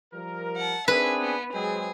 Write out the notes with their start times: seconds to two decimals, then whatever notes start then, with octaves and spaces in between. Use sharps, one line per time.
0.13 F3 G3 A#4
0.56 F#5 A5
0.88 C4 D4 G#4 B4 E5 G#5
1.21 B3
1.54 F#3 G#3 C4 G#4